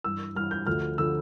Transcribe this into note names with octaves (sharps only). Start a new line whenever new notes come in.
G2 E3 E6
G2 E3 F6
G6
D2 D3 F3 F6
D3 F3 E6